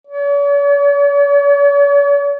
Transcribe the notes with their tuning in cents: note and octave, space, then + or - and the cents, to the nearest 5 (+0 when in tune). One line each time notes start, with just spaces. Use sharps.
C#5 +45